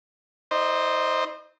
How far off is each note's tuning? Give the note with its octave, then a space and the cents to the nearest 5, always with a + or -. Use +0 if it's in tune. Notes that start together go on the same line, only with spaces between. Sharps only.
D#4 +45 C5 +0 D#5 -35